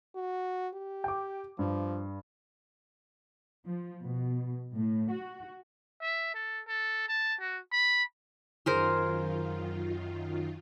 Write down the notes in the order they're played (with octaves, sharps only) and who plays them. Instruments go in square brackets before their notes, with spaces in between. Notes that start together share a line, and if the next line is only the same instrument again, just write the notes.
[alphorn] F#4
G4
[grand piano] G5 D6
[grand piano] G2 [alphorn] F3
[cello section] F3
B2
A2
F#4
[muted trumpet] E5
A4
A4
A5
F#4
B5
[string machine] F#2 D#3 F4 [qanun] G#4 A#4 C5